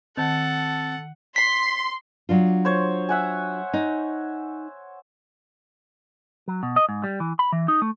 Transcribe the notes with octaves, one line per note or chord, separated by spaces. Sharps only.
D#3 C4 A4 F#5 A5
C6 B6
F#3 D4 F4
C5 C#5
E5 F#5 G#5
D#4
F#3
B2
D#5
G#2
G3
E3
B5
E3
D#4
A3